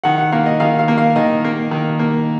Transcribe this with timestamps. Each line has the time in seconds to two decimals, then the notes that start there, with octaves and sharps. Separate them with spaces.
0.04 D#3 F#5
0.18 F#5
0.32 A#3 F5
0.46 D#5
0.60 D#3 F5
0.79 F5
0.88 A#3
0.98 F5
1.16 D#3 D#5
1.44 A#3
1.71 D#3
1.99 A#3